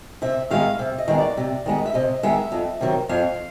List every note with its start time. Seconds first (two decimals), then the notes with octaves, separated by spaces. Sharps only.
0.22 C3 E5
0.51 D#3 G#3 B3 F5
0.79 C3 E5
0.98 D#5
1.08 D#3 G#3 B3
1.18 D5
1.37 C3
1.66 D#3 G#3 B3
1.86 E5
1.94 C3 D#5
2.23 D#3 G#3 B3 E5
2.52 F2
2.81 C3 D#3 F#3
3.09 F2 F5